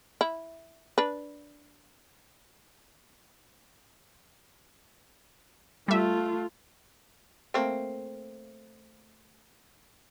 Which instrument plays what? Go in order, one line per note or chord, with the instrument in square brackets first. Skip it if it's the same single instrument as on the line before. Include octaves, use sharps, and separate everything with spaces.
[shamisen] E4
D4 B4
[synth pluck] G3 E5 [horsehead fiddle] A3 F4
[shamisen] A3 A#3 C4